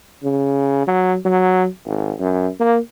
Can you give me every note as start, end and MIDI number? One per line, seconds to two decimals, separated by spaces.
0.23 0.84 49
0.87 1.17 54
1.25 1.67 54
1.86 2.12 32
2.20 2.48 42
2.60 2.78 58